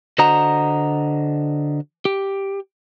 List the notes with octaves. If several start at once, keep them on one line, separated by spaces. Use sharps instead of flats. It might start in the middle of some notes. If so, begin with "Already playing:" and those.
D3 F#4 C5 D#5 F#5 A#5
G4